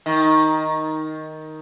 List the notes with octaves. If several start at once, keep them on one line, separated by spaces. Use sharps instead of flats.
D#3